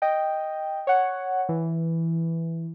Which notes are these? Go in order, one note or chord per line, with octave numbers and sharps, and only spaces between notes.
D#5 G5
C#5 F#5
E3